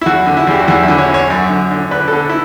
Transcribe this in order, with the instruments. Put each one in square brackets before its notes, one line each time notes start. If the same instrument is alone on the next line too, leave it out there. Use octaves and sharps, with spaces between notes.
[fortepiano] E4
E2 F#4
D3
E4
E2 G4
F#4
E2 E4
E4
D3
C#5
D3 C#5
F#2
D3
D3
D3 B4
A4
D3
E4